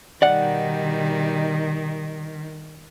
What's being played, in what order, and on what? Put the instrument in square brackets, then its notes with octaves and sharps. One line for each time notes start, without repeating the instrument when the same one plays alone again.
[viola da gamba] B2 G3 D#4 [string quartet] D#3 [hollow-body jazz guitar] D5 F#5